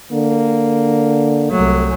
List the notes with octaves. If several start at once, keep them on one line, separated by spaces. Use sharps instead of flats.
D3 A#3
C2 F#3 A3